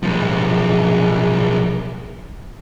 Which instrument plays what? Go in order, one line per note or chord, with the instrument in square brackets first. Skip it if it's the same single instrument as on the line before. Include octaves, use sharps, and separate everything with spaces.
[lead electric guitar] B1 F3